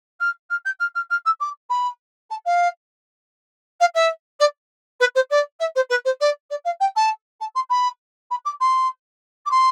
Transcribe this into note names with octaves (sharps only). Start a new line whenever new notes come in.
F6
F6
G6
F6
F6
F6
E6
D6
B5
A5
F5
F5
E5
D5
B4
C5
D5
E5
C5
B4
C5
D5
D5
F5
G5
A5
A5
C6
B5
B5
D6
C6
D6
C6